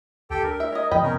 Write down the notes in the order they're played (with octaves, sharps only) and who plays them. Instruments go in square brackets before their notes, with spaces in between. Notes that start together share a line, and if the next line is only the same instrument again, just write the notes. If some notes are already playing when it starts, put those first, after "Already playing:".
[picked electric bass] D2 [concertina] G4 A4 G5
[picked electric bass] D4 [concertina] A#4
[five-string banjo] E5
C#5 D#5
[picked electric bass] F2 F3 [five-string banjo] D#5 G5 B5
[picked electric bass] C3 B3 [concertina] C#4 D#4 A#4